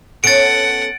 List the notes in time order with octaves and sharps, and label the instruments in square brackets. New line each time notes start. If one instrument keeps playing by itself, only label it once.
[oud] B3 C#4 A4 [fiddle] F#5 [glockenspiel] A6 D7